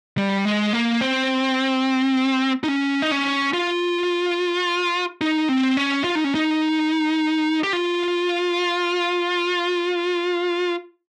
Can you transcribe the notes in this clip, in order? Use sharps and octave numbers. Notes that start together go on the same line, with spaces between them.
G3
G#3
A#3
C4
D#4
C#4
D#4
C#4
F4
D#4
C4
C#4
F4
D#4
C#4
D#4
G4
F4